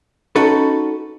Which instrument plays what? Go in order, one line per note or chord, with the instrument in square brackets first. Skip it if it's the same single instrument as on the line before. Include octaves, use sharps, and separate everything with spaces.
[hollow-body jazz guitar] C#4 D#4 F#4 A4 B4